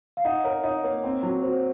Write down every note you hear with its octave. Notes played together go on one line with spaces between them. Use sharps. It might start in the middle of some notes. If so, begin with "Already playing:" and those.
F5
D#4 F#5
A#4 C#5
D#4 C#5
A#3 C#5
C4
F#3
F#4 C5